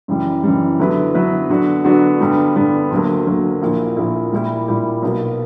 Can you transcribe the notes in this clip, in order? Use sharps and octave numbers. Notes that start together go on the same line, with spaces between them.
F#2 C#3 E3 G3
F#2 C#3 E3 G3
D3 F#3 B3 E4 B4
D3 F#3 B3 E4 B4
D3 F#3 B3 D4 F#4
D3 F#3 B3 D4 F#4
G2 D3 G3 B3
G2 D3 G3 B3
D2 D3 F#3 A#3
D2 D3 F#3 A#3
A#1 A#2 A#3 E4
A#1 A#2 A#3 E4
A#2 G3 A#3 E4 G4
A#2 G3 A#3 E4 G4
B1 B2 A#3